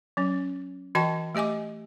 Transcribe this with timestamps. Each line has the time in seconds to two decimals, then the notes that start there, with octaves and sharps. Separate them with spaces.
0.17 F#3 C#4
0.95 E3 F#4 D#5 G5 A5 C#6
1.35 A3 G4 D#5 G#5 D6